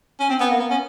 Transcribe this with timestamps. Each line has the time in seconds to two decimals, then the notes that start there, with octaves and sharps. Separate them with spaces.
0.20 C#4
0.29 C4
0.40 B3
0.51 A#3
0.60 B3
0.70 C#4